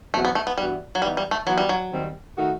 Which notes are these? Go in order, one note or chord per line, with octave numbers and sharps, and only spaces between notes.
E2 B2 F#3 A3 C4 F#4
B3
A3
B3
G2 E3 G3 B3 F#4
F#3
E3 G3 B3 D#4
G3
A3
E3 F#3 B3 F#4
G3
F#3
D#2 D#3 G3 C4
D#3 A3 D#4 F#4